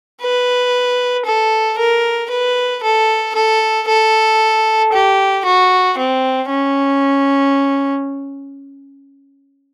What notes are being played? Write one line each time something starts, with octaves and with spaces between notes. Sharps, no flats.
B4
A4
A#4
B4
A4
A4
A4
G4
F#4
C4
C#4